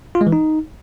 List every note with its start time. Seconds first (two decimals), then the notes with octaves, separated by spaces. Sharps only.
0.15 F4
0.21 G#3
0.27 E3
0.32 D#4